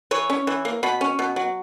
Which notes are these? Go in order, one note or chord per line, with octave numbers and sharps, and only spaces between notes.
E3 C#5
C#4
E3
A#3
B2 B5
C#4
B2
F#3